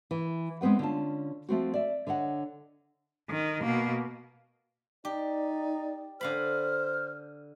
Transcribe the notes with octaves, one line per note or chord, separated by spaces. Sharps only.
E3
G#3 B3 C4 B4 F#5
D3 C#4 F4 A5
F3 A3 C4 F#4
D5 E5
D3 C#5 D#5 F#5
D#3
B2 A#3
D#4 G4 D5
D3 C5 F5 B5 F6